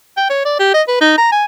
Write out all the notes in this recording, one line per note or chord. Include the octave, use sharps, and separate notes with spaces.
G5
C#5
D5
G4
D#5
B4
D#4
A#5
G#5